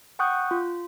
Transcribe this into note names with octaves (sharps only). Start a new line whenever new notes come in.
F#5 G5 C#6 D#6 F#6 G6
F4